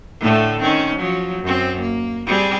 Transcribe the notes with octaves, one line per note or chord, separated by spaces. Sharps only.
A2 D3 A3
D#3 C4 C#4
F3 F#3
F#2 C4
A#3
G3 C4 G#4